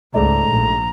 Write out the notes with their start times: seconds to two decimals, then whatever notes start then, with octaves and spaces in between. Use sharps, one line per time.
0.14 C#2 G#2 A3 D5 A#5
0.49 A#1